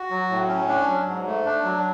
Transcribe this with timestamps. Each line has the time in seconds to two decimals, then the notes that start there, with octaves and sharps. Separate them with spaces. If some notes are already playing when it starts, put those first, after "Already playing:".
Already playing: F#4
0.10 F#3
0.30 A2
0.48 C#4
0.68 D4
0.87 F#3
1.07 G#2
1.26 A3
1.45 D4
1.64 F#3